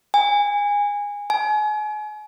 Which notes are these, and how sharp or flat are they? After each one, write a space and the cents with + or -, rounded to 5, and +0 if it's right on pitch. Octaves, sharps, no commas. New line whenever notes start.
G#5 -20
G#5 +35